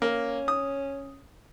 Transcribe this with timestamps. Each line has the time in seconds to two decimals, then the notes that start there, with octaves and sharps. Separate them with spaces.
0.02 A#3 C#4
0.48 D#6